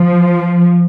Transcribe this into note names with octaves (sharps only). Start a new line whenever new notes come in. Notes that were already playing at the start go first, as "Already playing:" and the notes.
Already playing: F3